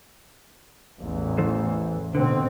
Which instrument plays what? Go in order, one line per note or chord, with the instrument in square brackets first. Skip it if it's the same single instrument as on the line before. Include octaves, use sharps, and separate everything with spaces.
[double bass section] A1 E2
[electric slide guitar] E3 A4 C5
[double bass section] B2 C4 [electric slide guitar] D3